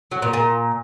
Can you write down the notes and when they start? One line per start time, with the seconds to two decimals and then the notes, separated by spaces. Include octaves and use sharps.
0.11 F#3
0.22 A#2
0.33 A#2